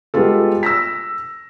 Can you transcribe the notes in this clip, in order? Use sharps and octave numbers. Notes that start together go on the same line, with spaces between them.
G3 G#3 B3 F4 A4
E6 A#6 B6